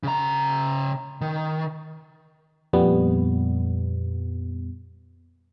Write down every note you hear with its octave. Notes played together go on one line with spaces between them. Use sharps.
C#3 A#5
D#3
F2 A#2 G3 B3